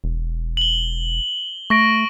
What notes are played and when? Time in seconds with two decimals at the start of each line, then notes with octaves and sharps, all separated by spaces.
0.04 E1
0.57 F#7 G7
1.70 A3 C#6 A#6 D7